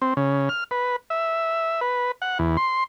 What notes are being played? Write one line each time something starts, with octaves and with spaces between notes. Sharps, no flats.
C4
C#3
F6
B4
E5
B4
F#5
E2
C6